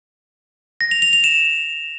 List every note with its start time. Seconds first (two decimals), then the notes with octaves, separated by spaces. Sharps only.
0.81 A#6
0.91 F7
1.02 F7
1.13 F7
1.24 E7